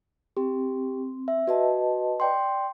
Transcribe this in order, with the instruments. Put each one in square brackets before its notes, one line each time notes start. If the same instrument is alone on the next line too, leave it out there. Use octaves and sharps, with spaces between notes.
[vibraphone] C4 [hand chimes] G4
[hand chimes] E5
[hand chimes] F#4 [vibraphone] B4 D#5 A5
[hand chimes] D5 G5 C6